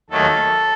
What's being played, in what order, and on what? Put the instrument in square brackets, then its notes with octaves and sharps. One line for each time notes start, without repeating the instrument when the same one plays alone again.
[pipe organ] D#2 D#3 F#3 A3 A4